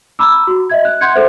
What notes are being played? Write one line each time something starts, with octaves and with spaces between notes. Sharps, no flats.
A#5 B5 D6 E6
F#4
D#5 E5 G#6
F#6
F#5 C6 G6 G#6 C#7
A4 C5 E5